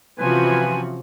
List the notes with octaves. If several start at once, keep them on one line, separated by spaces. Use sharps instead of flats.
C3 E3 F3 C#4 F#4 B4 G#5